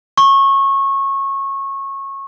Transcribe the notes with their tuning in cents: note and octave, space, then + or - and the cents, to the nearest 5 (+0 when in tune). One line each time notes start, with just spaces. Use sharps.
C#6 -20